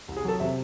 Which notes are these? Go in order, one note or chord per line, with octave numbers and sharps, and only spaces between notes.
C2
G#4
F#3 A4
C3 E5